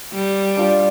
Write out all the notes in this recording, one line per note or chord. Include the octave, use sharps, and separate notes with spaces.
G3
D4 F4 D5